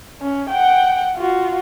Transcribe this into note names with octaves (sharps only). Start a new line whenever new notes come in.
C#4
F#5 G5
F4 F#4